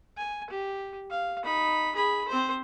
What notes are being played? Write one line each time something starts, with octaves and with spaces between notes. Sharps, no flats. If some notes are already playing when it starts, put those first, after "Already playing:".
G#5
G4
F5
D#4 B5
G#4 B5
C4 C5